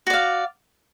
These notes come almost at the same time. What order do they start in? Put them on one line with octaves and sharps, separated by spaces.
F#4 D5 F5